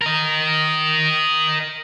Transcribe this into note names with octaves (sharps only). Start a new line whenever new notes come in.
A#4 D#5